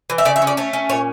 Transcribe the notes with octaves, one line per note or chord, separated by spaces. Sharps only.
E3
E5
C#3 D5
E5
C#4
D5
A3 C#5
C#4
A#2 C#5